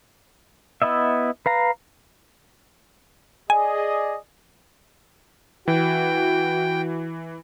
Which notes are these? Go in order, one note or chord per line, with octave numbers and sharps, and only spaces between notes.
B3 E4 D#5 E5
B4 F5 A#5
G#4 D5 D#5 G#5
E3 F#4 G5